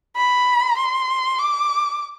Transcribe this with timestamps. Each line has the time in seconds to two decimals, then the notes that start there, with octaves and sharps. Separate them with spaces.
0.16 B5
0.77 C6
1.38 D6